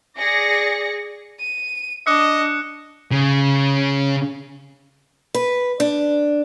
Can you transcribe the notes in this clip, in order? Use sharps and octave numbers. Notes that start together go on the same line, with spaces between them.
G#4 D5 A#6 C#7
D#7
D4 D#5 D6 F#6 C#7
C#3
B4
D4